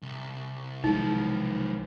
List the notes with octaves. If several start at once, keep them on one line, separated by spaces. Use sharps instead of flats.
C2
B1 D#3 F3 G#3 D#4